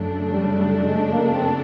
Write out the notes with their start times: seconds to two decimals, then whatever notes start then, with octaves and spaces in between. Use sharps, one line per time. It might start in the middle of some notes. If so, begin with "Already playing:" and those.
Already playing: F#2 C#3 F#3 A3 D4
0.30 G3
0.57 G3
0.84 G#3
1.12 A#3
1.33 C4